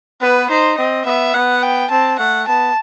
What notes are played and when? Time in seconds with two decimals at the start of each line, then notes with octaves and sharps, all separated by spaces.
0.21 B3 B4
0.50 D#4 C5
0.78 C4 D#5
1.06 B3 E5
1.34 B3 F#5
1.63 G5
1.90 C4 A5
2.19 A3 F#5
2.47 B3 A5